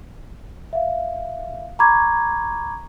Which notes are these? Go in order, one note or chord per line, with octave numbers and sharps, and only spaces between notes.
E5 F5
A#5 B5 C#6 D6 G#6